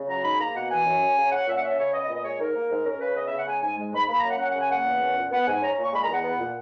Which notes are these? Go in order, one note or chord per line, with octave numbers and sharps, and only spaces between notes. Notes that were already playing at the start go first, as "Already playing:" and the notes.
Already playing: C#3
F#3 A#5
G#2 B5
A#3 A#5
B2 F#5
E3 G#5
F#2
C#4
C#3
C#4 F#5
A#2 E5
F#5
C#4 E5
C#3 C#5
B3 D#5
D#5
A#2
D#5
G#3 C#5
G#2 A#4
A#3
G#2
C#4 A#4
C#3 B4
B3 D#5
E5
C#3
F#5
G#3 G#5
G#2 G#5
G#3
G#2 B5
A#3 B5
A#5
F#2 F#5
C#4 F#5
F#5
C#3
G#5
A#3 F#5
E2
C#4
A#2
B3 F#5
G#2 G#5
C#4 A#5
A#2
C#6
G#3 B5
A#5
E2
F#5
B3
A#2